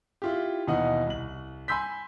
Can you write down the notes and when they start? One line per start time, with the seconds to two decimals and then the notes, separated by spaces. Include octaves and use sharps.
0.22 E4 F4 G4
0.67 D#2 B2 E3 D#4 D#5 F#5
1.07 C2 F#7
1.68 G#5 B5 C6 E6 G6 B6